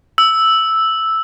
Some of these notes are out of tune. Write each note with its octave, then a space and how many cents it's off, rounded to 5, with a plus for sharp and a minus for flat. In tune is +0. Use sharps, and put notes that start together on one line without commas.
E6 -5